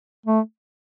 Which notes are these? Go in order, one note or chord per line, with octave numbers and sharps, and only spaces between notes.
A3